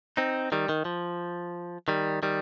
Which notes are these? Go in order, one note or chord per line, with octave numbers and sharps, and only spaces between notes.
C4 D#4
D#3 G3
D#3
F3
D#3 G3
D#3 G3